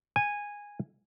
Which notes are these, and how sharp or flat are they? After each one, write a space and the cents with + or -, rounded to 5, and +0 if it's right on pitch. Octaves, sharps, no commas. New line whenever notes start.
G#5 -10